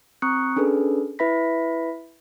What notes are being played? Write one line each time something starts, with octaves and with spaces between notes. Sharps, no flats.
C4 A#5 C#6 D#6 F#6 C#7
C#4 D4 G#4 A4 B4
E4 B4 E5 B5 A#6 B6